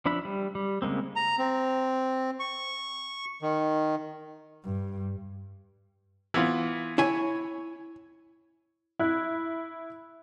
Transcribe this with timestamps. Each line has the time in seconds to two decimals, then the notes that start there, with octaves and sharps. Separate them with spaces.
0.06 F3 D4 E5 B5
0.25 G3
0.55 G3
0.82 C#3 G#3 A#3 C4
1.16 A#5
1.39 C4
2.40 C#6
3.42 D#3
4.64 G2
6.34 E3 B3 F4
6.98 E4 C#5 G#5
8.99 E4 F#6